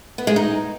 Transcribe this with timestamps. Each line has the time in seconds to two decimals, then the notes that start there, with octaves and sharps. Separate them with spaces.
0.18 B3
0.27 G#3
0.36 D#4